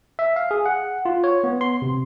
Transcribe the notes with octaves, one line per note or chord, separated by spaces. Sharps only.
E5
F5
G#4
F#5
F4
C#5
B3
C6
C3